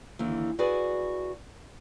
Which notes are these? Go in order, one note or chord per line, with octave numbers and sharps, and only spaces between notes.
D#2 D3 E3
E4 F#4 G#4 B4 D5